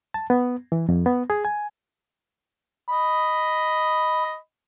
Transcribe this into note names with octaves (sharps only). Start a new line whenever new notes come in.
A5
B3
E3
F2
B3
G#4
G#5
D#5 B5